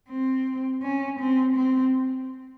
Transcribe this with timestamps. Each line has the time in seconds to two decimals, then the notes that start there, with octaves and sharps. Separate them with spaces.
0.10 C4
0.83 C#4
1.20 C4
1.56 C4